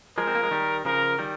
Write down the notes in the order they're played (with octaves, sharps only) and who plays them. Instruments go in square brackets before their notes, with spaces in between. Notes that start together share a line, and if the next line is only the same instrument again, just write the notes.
[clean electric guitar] F3 G#3 [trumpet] A#4
[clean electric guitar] C4
A#3
G#3
D#3 G3
[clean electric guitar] C#3 F3 [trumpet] A#4
[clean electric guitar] D#3 G3